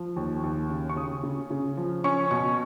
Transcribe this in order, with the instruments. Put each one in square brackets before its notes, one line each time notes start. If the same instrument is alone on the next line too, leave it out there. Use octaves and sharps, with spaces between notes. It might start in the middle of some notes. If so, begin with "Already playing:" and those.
Already playing: [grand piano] F3
D#2
D#2
C#3
C#6
C#3 D#6
C#3
C#3
F3
C#4 C#6
B2 C#6